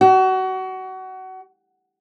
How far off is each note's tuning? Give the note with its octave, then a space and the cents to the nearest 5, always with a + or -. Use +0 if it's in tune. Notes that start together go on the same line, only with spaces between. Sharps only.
F#4 +25